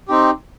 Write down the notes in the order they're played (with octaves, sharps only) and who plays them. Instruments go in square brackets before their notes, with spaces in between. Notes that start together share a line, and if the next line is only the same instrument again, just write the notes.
[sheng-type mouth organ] C4 D#4 G4